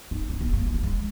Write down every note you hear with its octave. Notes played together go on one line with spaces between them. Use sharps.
D#4
C#4
B3
A#3
G#3
A#3
G#3